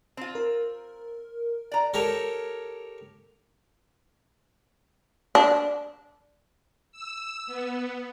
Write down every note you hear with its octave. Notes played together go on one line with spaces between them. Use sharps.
C4 F4
A#4
D5 A#5
G4 A4 A#4 C#5
D4
E6
B3